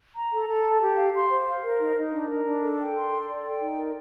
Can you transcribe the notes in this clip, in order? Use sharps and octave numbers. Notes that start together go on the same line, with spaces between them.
A#5
A4
A4
A5
G4
F5
C6
C5
F5
A#4
D#4
D#4
D4
A#4
D4
A4
G5
C6
A4
D5
G5
D#4
A#4